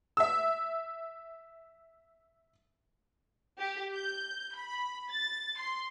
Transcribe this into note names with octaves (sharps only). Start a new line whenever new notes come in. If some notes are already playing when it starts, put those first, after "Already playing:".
E5 E6
G4
G6
B5
A6
C6